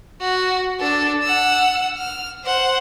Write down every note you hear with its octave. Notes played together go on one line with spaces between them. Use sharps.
F#4
D4 A4
F#5 E6
F6
C5 F#5